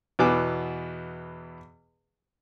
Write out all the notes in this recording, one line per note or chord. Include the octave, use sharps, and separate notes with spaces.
E2 B2 E3 D6